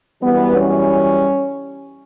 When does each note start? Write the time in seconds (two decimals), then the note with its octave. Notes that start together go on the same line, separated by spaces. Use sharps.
0.23 F#2 E3 G3 B3
0.56 C#4